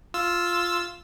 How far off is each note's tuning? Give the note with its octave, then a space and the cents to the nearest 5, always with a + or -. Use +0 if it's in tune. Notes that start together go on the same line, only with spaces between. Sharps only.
F4 +0 E6 +0